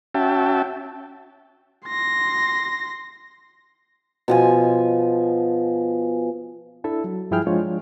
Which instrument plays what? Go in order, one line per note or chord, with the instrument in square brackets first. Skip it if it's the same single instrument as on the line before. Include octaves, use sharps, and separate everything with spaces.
[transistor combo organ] C#4 F#4 E5 G5 A5
[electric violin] C6 A#6
[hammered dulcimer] B2 F3 G#5
[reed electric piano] D4 E4 A4 E5
F#3
G2 F3 E4 G#4 G5 F6
F3 G#3 D4 F4 C#5